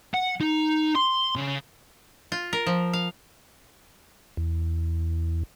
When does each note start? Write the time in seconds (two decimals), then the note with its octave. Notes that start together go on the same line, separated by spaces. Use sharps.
0.14 F#5
0.41 D#4
0.95 C6
1.36 C#3
2.32 F4
2.53 A#4
2.67 F3
2.93 F5
4.37 E2